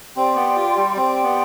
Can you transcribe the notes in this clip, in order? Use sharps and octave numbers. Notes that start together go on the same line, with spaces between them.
C4 G4 D5 G5 C6
B3
F4
G3
C4 G4 D5 G5 C6
B3